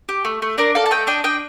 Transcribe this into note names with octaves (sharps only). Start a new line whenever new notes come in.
G4
A3
A3
D4 A#4 D5
A4 D5 F5
A5
A3 D#5 G5
D4 D#5 G5
D4 D#5 G5